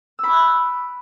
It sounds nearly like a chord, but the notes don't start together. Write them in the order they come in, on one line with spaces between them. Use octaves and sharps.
E6 B5 D6 F#6